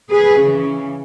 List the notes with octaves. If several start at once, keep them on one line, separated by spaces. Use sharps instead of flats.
G#4 B4
C#3 E3